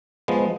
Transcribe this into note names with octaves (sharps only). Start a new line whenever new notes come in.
F3 G#3 B3